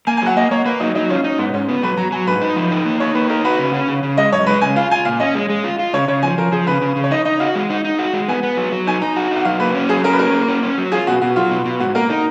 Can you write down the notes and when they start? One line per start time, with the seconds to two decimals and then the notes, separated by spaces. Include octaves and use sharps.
0.07 A#3 G#5
0.17 G#5
0.22 F#3 F#5
0.36 A#3 D#5
0.51 A#3 C#5
0.65 A#3 B4
0.80 F#3 D#4
0.95 F#3 D#4
1.10 C#4 F4
1.24 C#4 D#4
1.39 G#2 B3
1.54 G#2 C#4
1.69 B3
1.83 F#3 B4
1.97 F#3 A#5
2.12 F#3 G#5
2.27 G#2 B4
2.41 D#4
2.56 F3
2.71 D#4
2.85 A#3
3.00 D#4 C#5
3.15 A#3 B4
3.29 D#4 A#4
3.45 F#4 B4
3.59 C#3
3.74 C#4
3.88 C#3
4.03 C#3
4.17 G#3 D#5
4.32 F#2 C#5
4.46 G#3 B4
4.62 C#3 G#5
4.76 F4 F5
4.91 F4 G#5
5.05 A#2 F5
5.20 C#4 D#5
5.35 G#3
5.50 G#3
5.64 F4
5.79 F4
5.94 C#3 C#5
6.08 C#3 C#5
6.23 F3 G#5
6.38 F3 A#4
6.52 F3 G#4
6.67 C#3 B4
6.82 C#3
6.96 C#3
7.04 C#5
7.11 D#4 D#5
7.25 D#4 D#5
7.40 F#4 F5
7.55 G#3
7.70 D#4
7.84 D#4
7.99 F#4
8.13 G#3
8.28 B3 G#5
8.43 B3
8.57 F#3
8.72 F#3
8.87 D#4 G#5
9.01 D#4 A#5
9.16 F#4
9.31 D#4
9.36 F#5
9.45 F#3 F5
9.60 A#3 B4
9.75 C#4
9.89 F#3 G#4
10.04 C#4 A#4
10.13 B4
10.19 A#3 A#4
10.34 A#3
10.48 C#4
10.63 C#4
10.78 F#3
10.92 F4 G#4
11.07 B2 F#4
11.22 B2 F#4
11.36 F#3 F4
11.51 B2
11.65 B2
11.80 G#2 F#4
11.95 A#3 A#4
12.10 D#4 A#4